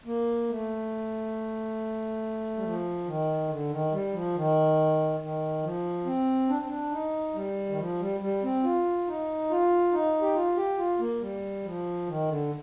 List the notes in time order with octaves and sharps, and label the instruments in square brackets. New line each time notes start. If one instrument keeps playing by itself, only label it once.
[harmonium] A#3
A3
G3
F3
D#3
D3
D#3
G3
F3
D#3
D#3
F3
C4
D4
C4
D4
D#4
G3
D#3
F3
G3
G3
C4
F4
D#4
F4
D#4
G4
F4
G4
F4
A#3
G3
F3
D#3
D3